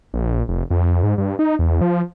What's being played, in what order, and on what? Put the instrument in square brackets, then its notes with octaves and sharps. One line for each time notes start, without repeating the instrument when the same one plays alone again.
[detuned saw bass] A#1
F1
F2
G#2
G2
D#4
E2
F3